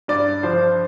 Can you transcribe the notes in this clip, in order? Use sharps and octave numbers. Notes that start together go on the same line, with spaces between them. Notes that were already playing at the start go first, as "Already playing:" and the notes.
G2 D5
F3 C5